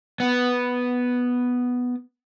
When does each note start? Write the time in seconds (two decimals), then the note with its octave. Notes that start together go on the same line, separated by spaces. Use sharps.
0.20 B3